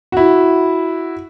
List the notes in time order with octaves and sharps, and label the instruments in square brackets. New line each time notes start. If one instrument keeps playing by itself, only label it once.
[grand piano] E4 F#4